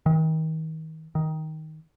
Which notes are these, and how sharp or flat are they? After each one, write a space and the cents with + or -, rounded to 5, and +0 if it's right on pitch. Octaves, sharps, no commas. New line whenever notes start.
D#3 +35
D#3 +10